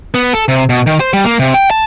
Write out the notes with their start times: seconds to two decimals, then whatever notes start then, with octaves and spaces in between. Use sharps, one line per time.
0.14 B3
0.33 A4
0.48 C3
0.69 B2
0.87 D#3
1.00 C5
1.13 G3
1.25 A#3
1.39 C3
1.54 G5
1.70 A5